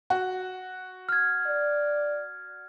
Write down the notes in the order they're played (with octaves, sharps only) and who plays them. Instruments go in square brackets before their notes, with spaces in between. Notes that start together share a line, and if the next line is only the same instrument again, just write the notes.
[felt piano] F#4
[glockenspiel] F6 G#6
[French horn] D5